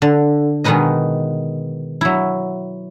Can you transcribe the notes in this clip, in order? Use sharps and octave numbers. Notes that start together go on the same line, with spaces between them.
D3
B2 D#3 G#3 D#4 B4 D#5
F#3 E4